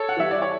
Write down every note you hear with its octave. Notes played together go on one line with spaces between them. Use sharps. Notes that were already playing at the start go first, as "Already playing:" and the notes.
Already playing: A4 C#5
F#5
E3 G3 E5
D5
C#5